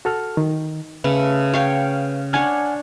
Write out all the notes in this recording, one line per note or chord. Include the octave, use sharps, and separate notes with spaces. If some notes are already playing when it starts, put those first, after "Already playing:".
F#4 A4 F6
D#3
C#3 A3 B4
C#5 F5 G5
D4 C#5 F#5 G#5 F6